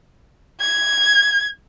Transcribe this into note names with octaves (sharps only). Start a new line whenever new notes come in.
G#6